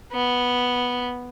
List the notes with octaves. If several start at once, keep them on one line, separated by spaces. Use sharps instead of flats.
B3